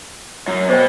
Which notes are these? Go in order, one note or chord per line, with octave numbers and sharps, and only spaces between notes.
F#2
B2 C5 G5